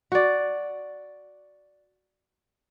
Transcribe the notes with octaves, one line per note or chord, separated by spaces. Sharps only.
F#4 D5